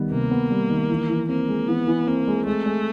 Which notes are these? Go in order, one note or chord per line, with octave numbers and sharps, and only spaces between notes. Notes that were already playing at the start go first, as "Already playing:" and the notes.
Already playing: D#3 G3 B3
C3 A#3
B3
G3
D#3
E3
E3
A#3 C4
G#3
E3 B3
E3
A#3 C4
G#3
G#3 A3
G#3